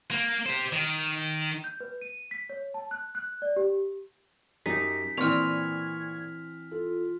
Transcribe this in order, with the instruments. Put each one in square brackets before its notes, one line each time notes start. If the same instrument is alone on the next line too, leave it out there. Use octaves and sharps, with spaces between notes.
[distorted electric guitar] A#3
G4 C5
D#3
[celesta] G6
B4
D#7
B6
C#5
A5
F#6
F#6
D5
G4
[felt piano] F#2 G4 A#6 [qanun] D#4 [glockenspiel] B6
[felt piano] A#2 D5 C#6 [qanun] E3 C4 [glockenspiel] F6 F7 [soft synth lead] G#6
[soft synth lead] F4 [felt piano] A4